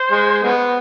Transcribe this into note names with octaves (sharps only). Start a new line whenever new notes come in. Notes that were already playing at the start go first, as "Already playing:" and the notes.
Already playing: C5
G#3
G#3 B3